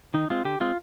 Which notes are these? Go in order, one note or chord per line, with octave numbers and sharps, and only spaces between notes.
D#3 D#4
G#3 C4 F4
D3 G4
G#3 C4 F4